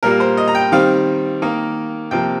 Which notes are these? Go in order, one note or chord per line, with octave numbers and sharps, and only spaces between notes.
A#2 G3 A#3 A#4
C5
D#5
A#5
G5
D#3 G3 C4 F5
D#3 A#3
C3 F3 A#3 G5